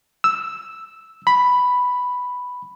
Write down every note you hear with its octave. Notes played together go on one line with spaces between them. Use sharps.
E6
B5